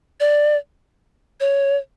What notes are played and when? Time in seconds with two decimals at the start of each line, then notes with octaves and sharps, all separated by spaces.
0.20 D5
1.40 C#5